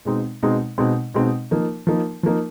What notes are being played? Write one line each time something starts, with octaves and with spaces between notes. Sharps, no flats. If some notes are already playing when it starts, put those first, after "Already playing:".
B2 G#3 C4 D#4
B2 G#3 C4 D#4
B2 G#3 C4 D#4
B2 G#3 C4 D#4
F3 A#3 D#4
F3 A#3 D#4
F3 A#3 D#4